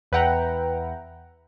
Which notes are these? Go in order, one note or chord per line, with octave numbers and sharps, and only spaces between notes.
E2 B4 E5 F#5 G5 A#5